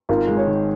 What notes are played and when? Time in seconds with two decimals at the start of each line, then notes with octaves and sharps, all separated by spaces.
0.09 G#1 F4 A#4
0.27 G#3
0.37 G#4 C#5
0.47 D#3